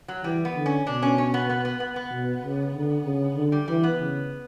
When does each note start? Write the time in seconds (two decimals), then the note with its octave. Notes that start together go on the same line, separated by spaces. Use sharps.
0.08 F#3
0.24 E3 G3
0.45 B3
0.56 D3
0.66 C#4
0.87 B2 D4
1.03 C#4
1.18 C#4
1.34 B3
1.50 B3
1.65 B3
1.80 B3
1.96 B3
2.12 B2
2.43 C#3
2.75 D3
3.05 C#3
3.36 D3
3.52 G3
3.68 E3 G3
3.83 B3
3.99 C#3